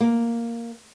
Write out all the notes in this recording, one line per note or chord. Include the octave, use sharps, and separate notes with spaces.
A#3